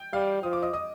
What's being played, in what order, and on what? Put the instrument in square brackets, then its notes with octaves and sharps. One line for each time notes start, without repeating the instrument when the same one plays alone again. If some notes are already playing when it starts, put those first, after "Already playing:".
Already playing: [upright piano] G5 G6
[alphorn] G3 [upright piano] F5 F6
[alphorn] F3 [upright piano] D#6
[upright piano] D6
D#5 D#6
D#5 D#6